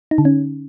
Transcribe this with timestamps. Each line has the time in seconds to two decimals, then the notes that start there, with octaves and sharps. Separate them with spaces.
0.11 D#4
0.18 D3
0.25 C#4